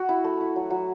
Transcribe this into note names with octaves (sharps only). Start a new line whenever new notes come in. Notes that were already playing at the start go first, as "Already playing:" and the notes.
Already playing: F#4
E4
A3
E4
F#3
F#3